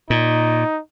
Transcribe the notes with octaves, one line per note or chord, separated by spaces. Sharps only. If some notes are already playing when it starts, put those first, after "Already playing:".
A#2 D#4